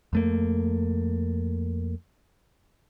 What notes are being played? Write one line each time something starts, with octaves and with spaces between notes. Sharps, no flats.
F2 A3 A#3